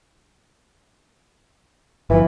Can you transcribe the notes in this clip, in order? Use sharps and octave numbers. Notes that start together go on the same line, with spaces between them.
G1 E3 F3